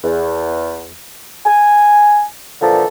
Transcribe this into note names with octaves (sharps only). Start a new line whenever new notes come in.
E2
G#5
A#2 D3 E3 F3 A4